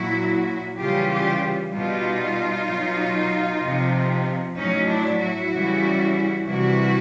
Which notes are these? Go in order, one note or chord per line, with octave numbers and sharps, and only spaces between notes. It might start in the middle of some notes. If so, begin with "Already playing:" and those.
Already playing: A#2 F#3 E4 F#4
C#3 E3 G3 F4 G4
F4 G4
B2 G3 D#4 F4
B2 F#3
C3 F3
A2 F#3 C#4 D#4
D4 E4
E4 F#4
C#3 E3 G3
C3 E3 G3 E4 F#4